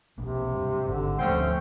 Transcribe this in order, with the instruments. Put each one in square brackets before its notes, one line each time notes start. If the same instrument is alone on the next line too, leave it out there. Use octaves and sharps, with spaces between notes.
[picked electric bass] B1 A#3 [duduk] C3
[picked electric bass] G2
[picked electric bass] G#1 [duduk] D3
[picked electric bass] D2 F3 A#3 [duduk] A3 [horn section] C4 C#4 C5